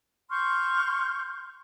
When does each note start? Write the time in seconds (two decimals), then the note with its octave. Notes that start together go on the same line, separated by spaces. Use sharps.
0.30 C6 C#6 F6 G6